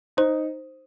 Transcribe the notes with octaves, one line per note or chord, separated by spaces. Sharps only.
D#4 C5